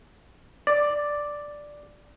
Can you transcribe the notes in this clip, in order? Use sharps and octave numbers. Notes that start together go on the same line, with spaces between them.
D5